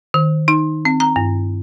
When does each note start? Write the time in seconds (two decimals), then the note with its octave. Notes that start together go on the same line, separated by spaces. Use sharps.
0.14 D#3
0.48 D#4
0.85 C4
1.00 A#5
1.16 G2